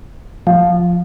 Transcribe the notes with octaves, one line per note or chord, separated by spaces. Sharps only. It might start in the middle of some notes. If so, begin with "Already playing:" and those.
F3